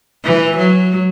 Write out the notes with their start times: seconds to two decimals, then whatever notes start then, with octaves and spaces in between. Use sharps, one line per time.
0.25 E3
0.57 F#3